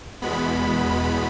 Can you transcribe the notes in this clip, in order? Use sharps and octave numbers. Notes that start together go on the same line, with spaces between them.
E2 B2 G#3 B3 B5